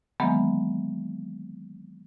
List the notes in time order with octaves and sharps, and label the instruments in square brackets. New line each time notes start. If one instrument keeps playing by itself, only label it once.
[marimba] D#3 E3 F#3 G#3 A#3 B3